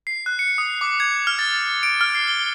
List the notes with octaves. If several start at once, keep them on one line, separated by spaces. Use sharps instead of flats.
C7
F#6
C#7
D#6
D6
G#6
F6
A6
D7
F6
C7
G7